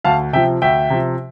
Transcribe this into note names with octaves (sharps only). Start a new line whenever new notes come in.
D2 F5 A5
C3 F3 E5 G5
D2 E5 G5
C3 F3